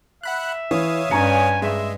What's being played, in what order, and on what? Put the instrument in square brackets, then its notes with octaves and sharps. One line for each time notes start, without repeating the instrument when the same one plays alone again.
[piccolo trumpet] E5 [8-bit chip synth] F#5 B5 F#6
[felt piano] E3 [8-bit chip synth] C#5 F5 D#6
[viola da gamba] G2 [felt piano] C#4 A#5 C#7 [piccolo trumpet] G#5
[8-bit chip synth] G#3 [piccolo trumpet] E5